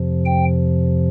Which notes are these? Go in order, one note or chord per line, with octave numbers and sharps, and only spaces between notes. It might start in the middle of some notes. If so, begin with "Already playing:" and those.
Already playing: F2 C3 F3
G5